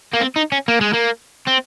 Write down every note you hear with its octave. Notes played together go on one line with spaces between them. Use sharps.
A#3
C4
D#4
C#4
A#3
G#3
A#3
C4